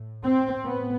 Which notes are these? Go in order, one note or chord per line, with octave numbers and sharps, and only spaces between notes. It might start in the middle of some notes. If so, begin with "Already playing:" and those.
Already playing: A2
C4
A2 B3